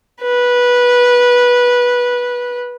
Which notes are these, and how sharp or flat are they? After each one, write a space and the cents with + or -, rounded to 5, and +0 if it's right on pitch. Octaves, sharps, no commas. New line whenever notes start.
B4 -15